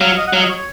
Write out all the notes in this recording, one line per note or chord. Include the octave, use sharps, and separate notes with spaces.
F#3 F5
D#5
F#5
F#3 F5
D#5
C#5